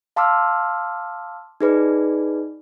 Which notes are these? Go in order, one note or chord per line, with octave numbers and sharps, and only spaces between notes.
F5 A5 C6 D6 E6 F6
D#4 G#4 B4 D5